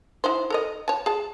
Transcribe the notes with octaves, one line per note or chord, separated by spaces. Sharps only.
D#4 E4 C5
A4 A#4 D#5
C#5 A5
G#4 A5